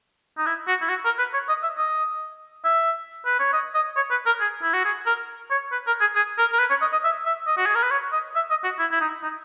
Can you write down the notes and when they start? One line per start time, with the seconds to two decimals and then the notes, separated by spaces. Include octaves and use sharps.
0.38 D#4
0.47 E4
0.68 F#4
0.82 E4
0.89 F#4
1.05 A#4
1.19 B4
1.34 C#5
1.49 D#5
1.63 E5
1.78 D#5
2.65 E5
3.26 B4
3.40 C#5
3.53 D#5
3.74 D#5
3.96 C#5
4.11 B4
4.26 A#4
4.41 G#4
4.62 E4
4.74 F#4
4.85 G#4
5.06 A#4
5.51 C#5
5.72 B4
5.87 A#4
6.01 G#4
6.15 G#4
6.38 A#4
6.52 A#4
6.60 B4
6.70 C#5
6.82 D#5
6.92 D#5
7.04 E5
7.26 E5
7.47 D#5
7.58 F#4
7.66 G#4
7.75 A#4
7.83 B4
7.91 C#5
8.13 D#5
8.36 E5
8.50 D#5
8.64 F#4
8.79 E4
8.92 E4
9.01 D#4
9.23 D#4